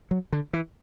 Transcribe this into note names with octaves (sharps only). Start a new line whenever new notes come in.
F#3
D3
E3